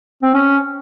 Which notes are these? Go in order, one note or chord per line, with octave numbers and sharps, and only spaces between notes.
C4
C#4